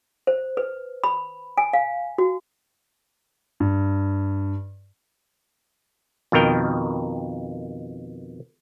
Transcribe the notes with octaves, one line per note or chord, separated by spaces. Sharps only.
C5
B4
B5
G#5
F5
F#4
G2
F2 B2 D#3 A#4 G5